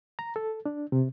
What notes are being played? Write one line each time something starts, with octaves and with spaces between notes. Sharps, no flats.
A#5
A4
D4
C3